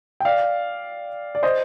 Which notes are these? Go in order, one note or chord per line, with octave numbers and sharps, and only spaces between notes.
G5
D5 F5
D5
C5 D#5